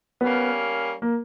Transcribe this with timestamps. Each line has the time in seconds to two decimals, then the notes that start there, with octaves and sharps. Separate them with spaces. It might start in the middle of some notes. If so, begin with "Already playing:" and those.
0.21 G3 A#3 B3 C#4
1.02 A#3